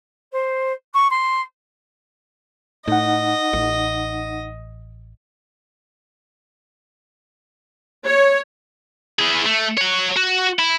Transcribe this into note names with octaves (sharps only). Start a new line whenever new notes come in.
C5
C#6
C6
A2 D#4 D#5 F#5
A1
C#5
E3 G#4
A3
C#5 F#5
F#4
E4